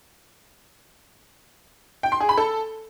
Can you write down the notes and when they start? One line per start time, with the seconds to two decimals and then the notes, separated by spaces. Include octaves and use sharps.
2.03 G5
2.12 C6
2.20 G#4
2.29 B5
2.38 A4